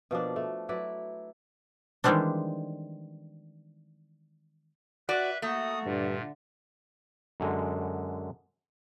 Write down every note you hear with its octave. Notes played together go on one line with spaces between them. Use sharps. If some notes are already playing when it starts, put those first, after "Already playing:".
B2 F3 A#3 D4
A3
F#3 E4 B4 D5
D#3 E3 G3 G#3 C4 D4
F#4 B4 D5 E5
A3 A#3 F#4 D#6
G2 A#2 D3
F#2 D3 G#3